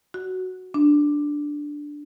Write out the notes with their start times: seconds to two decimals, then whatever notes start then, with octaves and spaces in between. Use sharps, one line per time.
0.14 F#4
0.74 D4